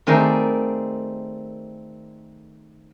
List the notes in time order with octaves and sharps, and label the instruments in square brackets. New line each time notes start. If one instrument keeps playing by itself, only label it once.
[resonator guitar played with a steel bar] D#3 A3 C4 G#4 A#4 D5